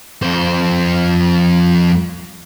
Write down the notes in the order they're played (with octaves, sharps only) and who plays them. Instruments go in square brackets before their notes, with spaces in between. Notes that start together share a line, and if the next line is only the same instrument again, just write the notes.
[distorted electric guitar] F2 C5